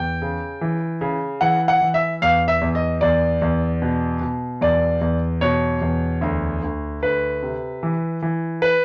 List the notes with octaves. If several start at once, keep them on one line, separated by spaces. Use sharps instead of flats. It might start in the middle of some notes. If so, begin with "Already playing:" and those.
Already playing: E2 G5
C#3
E3
C#3
E3 F#5
F#5
E3
E5
E2 F5
E5
E2
D#5
E2 D5
E2
B2
B2
E2 D5
E2
B2 C#5
E2
D2
D2
D2 B4
C3
E3
E3
B4